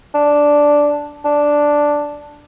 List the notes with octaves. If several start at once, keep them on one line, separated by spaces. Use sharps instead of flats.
D4
D4